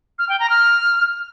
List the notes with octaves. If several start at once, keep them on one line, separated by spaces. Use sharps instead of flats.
F6
G5
A#5
F6